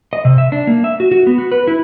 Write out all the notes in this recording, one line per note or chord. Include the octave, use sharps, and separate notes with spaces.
D#5
C3
E5
D4
A#3
E5
F#4
F#4
B3
F#4
B4
E4